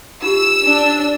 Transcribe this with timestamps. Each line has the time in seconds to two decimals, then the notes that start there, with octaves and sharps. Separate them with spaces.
0.22 D#4 F4 G4 E6
0.63 D4